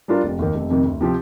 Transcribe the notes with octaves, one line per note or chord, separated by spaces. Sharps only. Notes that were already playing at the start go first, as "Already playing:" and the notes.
G3 D4 F4 A#4
F1
D#2 D#3
F1
F2 C3 D#3
D2
C3 F3 C4 G4